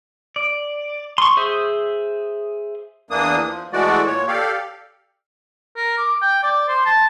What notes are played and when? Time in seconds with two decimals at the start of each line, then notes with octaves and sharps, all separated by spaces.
0.36 D5
1.18 C6 C#6
1.37 G#4 C5 E5
3.11 E2 E3 A#3 D4 D#6
3.47 F3
3.73 E3 G#3 A3 F#4 D5
4.07 A#2 C#5
4.28 G4 A4 D5 F5
5.76 A#4
5.98 D6
6.22 G5
6.43 D5
6.68 C5
6.85 A5